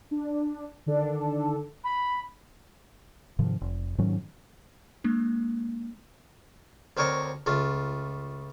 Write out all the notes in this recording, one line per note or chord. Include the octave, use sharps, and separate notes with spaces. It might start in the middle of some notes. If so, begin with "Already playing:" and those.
D4
D3 D#3 D4 A4
B5
G#2 C3 D#3 F3
F1
G#2 D#3 F#3 C#4
G#3 A#3 D4
D2 C4 A#4 C#5 D#5 A5
C#2 A3 F4